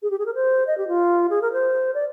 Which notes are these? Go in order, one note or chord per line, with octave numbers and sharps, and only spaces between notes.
G#4
G4
G#4
A#4
C5
D#5
G4
F4
G#4
A#4
C5
D5